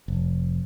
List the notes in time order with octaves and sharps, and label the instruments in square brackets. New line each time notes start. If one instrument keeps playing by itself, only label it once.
[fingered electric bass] F1